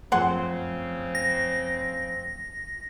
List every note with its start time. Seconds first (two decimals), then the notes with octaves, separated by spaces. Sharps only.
0.12 F#2 C#3 F3 A3 C4 G#4 F#5 C6
1.15 A#6